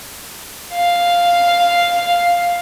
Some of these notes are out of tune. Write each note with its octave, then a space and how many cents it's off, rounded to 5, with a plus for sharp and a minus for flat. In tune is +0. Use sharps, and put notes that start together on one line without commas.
F5 +0